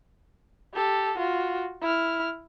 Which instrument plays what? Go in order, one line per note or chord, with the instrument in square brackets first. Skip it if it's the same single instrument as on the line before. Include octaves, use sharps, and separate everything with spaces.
[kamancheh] G4 A4
F4 F#4
E4 F6